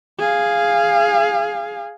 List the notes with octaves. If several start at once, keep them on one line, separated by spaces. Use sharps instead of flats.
G#4 F5